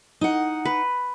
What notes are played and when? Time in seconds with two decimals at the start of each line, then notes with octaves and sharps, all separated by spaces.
0.21 D#4 F#5
0.65 B4